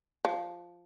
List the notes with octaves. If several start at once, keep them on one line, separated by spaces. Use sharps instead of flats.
F3